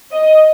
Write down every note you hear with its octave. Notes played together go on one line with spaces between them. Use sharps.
D#5